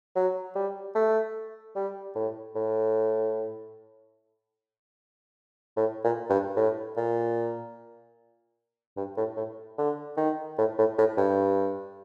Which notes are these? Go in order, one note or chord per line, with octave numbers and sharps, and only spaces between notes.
F#3
G3
A3
G3
A2
A2
A2
A#2
G2
A2
A#2
G2
A2
A2
D3
D#3
A2
A2
A2
G2